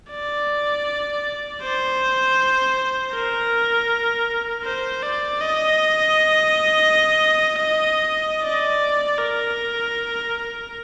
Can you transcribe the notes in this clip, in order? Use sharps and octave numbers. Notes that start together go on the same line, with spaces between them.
D5
C5
A#4
C5
D5
D#5
D5
A#4